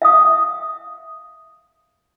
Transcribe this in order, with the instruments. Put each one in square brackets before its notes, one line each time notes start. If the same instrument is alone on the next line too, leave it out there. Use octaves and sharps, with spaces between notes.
[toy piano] E5 F5 D#6